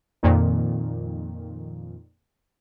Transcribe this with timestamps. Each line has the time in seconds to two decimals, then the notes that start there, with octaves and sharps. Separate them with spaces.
0.23 F2 A#2 D#3